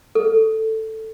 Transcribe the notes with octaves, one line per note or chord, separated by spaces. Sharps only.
A4